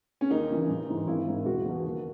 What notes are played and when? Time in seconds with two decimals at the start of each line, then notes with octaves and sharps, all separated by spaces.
0.21 C#4
0.31 D#2 D#4
0.49 C#3 E3
0.69 A1
0.88 G#2 E3
1.07 G#1 E4
1.27 G#2 D#3
1.45 E1 F#4
1.65 E2 B2
1.84 D#2